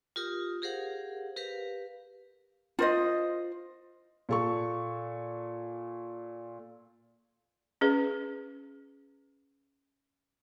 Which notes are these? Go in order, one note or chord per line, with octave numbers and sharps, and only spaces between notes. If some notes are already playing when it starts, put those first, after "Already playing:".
F4 G4 A#4 D#6
G4 G#4 A#4 C5 F5 F#5
G4 A#4 B4 F5
F4 C5 D#5
A#2 A4 C#6
C#4 G#4 B4